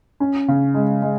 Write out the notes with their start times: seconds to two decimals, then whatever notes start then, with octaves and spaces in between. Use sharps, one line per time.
0.20 C#4
0.48 C#3
0.74 G#3
1.02 G#3